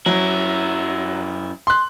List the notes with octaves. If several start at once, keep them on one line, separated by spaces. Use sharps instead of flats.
F#2 F#3 E4
C6 F#6